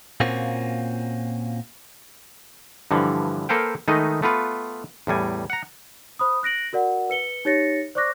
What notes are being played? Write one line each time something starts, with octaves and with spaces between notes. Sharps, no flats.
A#2 A#3 C4 C#4 F4 F#4
G2 D3 E3 F3
A#3 A4 B4 C5 F5 G5
D#3 G#3 A3 D#4 B4 D#5
A3 B3 F4 B4
E2 A2 G3 G#5
F#5 A#5
C5 B5 D#6
F#6 A#6 D7 F#7
F#4 A#4 D5 F#5
B4 C#7 G7
D#4 G4 C#5 A6 A#6 C#7
C5 D5 C#6 D6 F#6 A#6